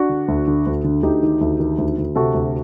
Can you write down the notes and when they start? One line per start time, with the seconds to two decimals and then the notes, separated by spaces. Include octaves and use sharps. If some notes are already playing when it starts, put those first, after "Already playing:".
Already playing: D4 F#4
0.09 D3
0.28 D2
0.47 D3
0.66 D2
0.84 D3
1.03 D2 D#4 G4
1.23 D#3
1.41 D2
1.60 D#3
1.78 D2
1.98 D2
2.15 C3 F#4 A4
2.34 D2